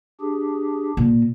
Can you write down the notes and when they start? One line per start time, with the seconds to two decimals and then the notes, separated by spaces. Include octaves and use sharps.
0.21 D4 G4 G#4
0.97 A#2